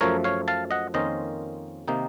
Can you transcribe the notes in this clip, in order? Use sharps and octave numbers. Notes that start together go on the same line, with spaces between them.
F#2 F3 A3 A#4 C#5
C#5 F5
F5 A5
D#5 F#5
F2 D#3 A#3 C#4 F4 C5 D#5
C3 D#3 A#3 D#4